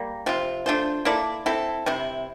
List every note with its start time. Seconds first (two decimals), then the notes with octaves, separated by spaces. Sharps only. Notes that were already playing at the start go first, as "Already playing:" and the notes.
Already playing: G3 A#3
0.26 C3 F3 C4 F4
0.66 A3 D4 F4 C5
1.05 A#3 E4 A4 D5
1.46 C4 E4 A4
1.86 C3 G3 C4 E4